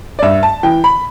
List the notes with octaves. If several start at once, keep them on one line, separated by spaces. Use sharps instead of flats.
D5
G2 E5
A5
E3 G5
B5